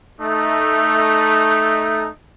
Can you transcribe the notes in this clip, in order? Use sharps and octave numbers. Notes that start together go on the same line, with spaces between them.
A3 D#4